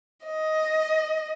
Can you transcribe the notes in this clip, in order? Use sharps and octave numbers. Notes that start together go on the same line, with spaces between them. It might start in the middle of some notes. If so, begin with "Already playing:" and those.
D#5